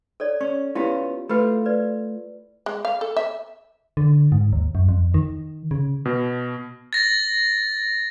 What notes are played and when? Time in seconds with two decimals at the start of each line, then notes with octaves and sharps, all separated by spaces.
0.20 A4 C#5 D5
0.41 C#4 C#6
0.75 B3 C#4 E4 F4 G4
1.29 A3 F4 B4 B5
1.66 B4 D5
2.66 G#3
2.85 F5
3.01 A4
3.17 E5
3.97 D3
4.32 G#2
4.53 D#2
4.75 F#2
4.89 F2
5.14 D#3
5.71 C#3
6.05 B2
6.93 A6 A#6